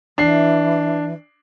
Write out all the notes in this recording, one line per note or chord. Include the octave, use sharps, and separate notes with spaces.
E3 D4 C7